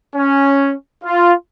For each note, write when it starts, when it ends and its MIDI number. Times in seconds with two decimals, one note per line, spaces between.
0.15 0.74 61
1.04 1.34 65